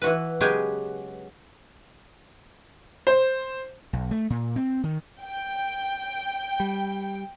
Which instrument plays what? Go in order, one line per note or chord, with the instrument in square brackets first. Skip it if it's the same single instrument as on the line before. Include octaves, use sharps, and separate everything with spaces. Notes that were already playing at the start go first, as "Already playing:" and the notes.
[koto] E3 F#4 B4
C#3 F#3 G#3 B3 G4 G#4
[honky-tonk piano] C5
[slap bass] B1
A3
A#2
C4
D#3
[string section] G5
[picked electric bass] G3